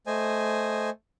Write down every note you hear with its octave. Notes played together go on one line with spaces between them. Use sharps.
A3 C5 D#5 G#5